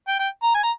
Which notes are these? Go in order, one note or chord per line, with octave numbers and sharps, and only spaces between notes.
G5
G5
A#5
G#5
A#5